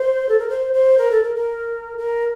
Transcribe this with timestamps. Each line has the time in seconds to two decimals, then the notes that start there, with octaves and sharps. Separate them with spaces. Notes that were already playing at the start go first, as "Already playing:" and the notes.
Already playing: C5
0.29 A4
0.39 A#4
0.49 C5
0.73 C5
0.98 A#4
1.11 A4
1.23 A#4
1.36 A#4
1.98 A#4